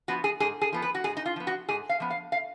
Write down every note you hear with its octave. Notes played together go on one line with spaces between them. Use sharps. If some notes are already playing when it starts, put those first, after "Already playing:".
F3 B3 F#4
G#4
G#2 G#4
G#4
F3 B3
B4
F#4
G#2 G#4
D#4
F4
F3 B3
F#4
G#2 G#4
F5
F3 B3
F5
F5